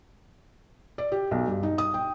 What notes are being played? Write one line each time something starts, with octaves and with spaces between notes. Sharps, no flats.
D5
G4
B1
G2
D#4
D#6
G5